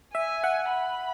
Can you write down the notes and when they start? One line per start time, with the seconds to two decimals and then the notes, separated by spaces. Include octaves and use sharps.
0.15 E5 G#5
0.44 F#5
0.71 B5